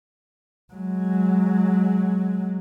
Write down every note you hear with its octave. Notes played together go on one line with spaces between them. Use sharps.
F#3 G#3